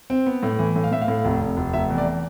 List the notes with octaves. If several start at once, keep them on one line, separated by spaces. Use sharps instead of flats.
C4
B3
A2
E3
A2
F5
A2 E5
F5
A2
F1
F1
F1
F1 E5
E2
D5